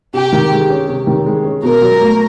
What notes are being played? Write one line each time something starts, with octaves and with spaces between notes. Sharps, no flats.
C3 G4
D#3
G#3
C#4
C3
D#3
G#3
C#4
B2 A#4
F#3
A3